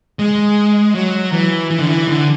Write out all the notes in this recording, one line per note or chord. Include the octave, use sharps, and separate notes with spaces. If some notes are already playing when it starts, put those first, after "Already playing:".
G#3
F#3
E3
E3
D3
E3
D3